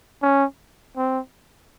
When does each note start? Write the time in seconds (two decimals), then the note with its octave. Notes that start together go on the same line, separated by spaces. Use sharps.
0.22 C#4
0.97 C4